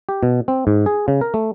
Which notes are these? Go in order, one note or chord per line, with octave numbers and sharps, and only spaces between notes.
G4
B2
C4
G#2
G#4
C#3
A#4
A3